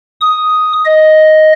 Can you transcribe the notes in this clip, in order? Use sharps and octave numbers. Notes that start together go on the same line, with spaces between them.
D#6
D#5